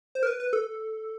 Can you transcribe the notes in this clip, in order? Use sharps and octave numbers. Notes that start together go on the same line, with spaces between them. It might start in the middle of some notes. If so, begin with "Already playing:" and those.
C5
A#4
B4
B4
A4